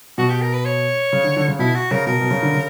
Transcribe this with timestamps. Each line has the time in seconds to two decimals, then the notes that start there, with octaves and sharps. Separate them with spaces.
0.18 B2 F#4
0.30 G4
0.42 A#4
0.53 B4
0.65 C#5
1.13 C#3
1.24 D3
1.36 D3
1.48 C#3
1.59 B2 E4
1.75 F#4
1.91 C#3 A#4
2.07 B2 A#4
2.21 B2
2.31 C#3
2.43 D3
2.54 C#3